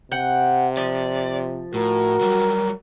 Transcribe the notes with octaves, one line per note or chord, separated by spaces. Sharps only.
C3 F#5 G5
F3 D5
A2 F#4 A#4
F#3 G3